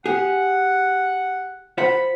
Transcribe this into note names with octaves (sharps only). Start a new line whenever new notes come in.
G4 G#4 F#5
F4 C5 F#5 B5